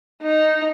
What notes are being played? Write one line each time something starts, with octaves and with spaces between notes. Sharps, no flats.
D#4